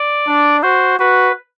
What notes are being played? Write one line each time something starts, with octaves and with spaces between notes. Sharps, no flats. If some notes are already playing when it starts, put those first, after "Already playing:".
Already playing: D5
D4
F#4 C5
F#4 B4